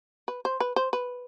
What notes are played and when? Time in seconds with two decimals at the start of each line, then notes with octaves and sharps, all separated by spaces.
0.28 B4
0.45 C5
0.60 B4
0.76 C5
0.93 B4